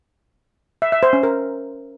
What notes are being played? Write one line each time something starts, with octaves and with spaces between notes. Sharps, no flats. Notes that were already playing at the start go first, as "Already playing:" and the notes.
E5
E5
C5
C#4
A#4